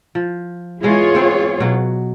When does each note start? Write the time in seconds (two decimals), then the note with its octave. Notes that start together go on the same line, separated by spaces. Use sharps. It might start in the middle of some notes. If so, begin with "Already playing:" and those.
0.15 F3
0.83 E3 G#3 B3 F4 G#4 C#5
1.15 B3 C4 C5
1.60 B2 F#3